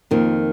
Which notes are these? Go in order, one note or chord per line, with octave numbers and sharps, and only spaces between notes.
F2 D#3 A#3 F4